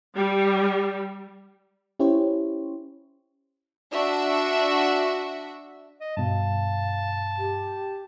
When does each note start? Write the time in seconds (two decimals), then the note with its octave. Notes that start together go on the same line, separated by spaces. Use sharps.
0.16 G3
1.99 C#4 E4 G4 C5 C#5
3.92 D4 F#4 E5
6.01 D#5
6.17 G2 B2 F5 A5
7.38 G4